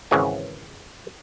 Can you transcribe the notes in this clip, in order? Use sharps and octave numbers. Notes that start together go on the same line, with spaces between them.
G#1 C#3 E3 G#5